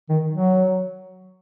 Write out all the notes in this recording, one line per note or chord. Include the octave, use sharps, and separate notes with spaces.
D#3
F#3